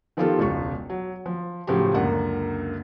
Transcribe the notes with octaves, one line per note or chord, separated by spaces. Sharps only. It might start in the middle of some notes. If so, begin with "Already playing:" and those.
D#3 F3 B3 F4 G4 A4
E1 C#2 F4 C#6
F#3
F3
A2 C#3 F3 F#3 G4
C#2 F#2 D3 A#3 F#5